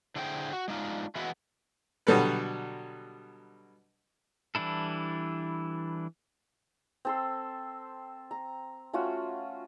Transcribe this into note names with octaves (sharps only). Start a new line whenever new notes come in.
D3 D4 E4 G#4 C5 G5
F#4
G#3 D4 D#4 F4
E3 G#3 B3 E4 F#4
B2 D3 F#3 G3 A4 B4
E3 G3 D4 E4 A4
C4 A4 C6
A#5
A3 C#4 F4 F#4